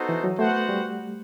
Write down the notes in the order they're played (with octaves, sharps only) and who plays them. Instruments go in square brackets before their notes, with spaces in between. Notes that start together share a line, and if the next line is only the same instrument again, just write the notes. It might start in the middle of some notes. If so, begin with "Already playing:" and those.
Already playing: [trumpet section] B3 D#4 F#4 A4 C5
[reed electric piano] E3
F#3
[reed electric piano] A3 [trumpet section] B3 F#4 C5 F#5
[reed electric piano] G3